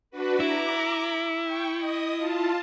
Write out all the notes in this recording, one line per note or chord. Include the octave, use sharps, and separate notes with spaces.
D4 F#4 B4
E4 A#5 D6
G5 C#6
D#5 D#6
F4 A5